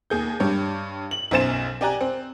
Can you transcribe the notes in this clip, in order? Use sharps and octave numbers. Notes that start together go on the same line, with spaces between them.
D#2 G#4 G6
G2 G4 C#5
F#7
B1 F#2 C5 A6 E7
G4 D5 G#5 A#5 F#6
C4